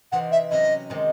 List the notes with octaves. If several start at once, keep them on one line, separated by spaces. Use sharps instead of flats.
C3 E3 C4 D#4 F#5
E5
C3 F#3 C#4 E4 D#5
C3 D#3 G#3 D#4